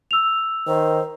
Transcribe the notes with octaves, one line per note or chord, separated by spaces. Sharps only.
E6 F7
D#3 C5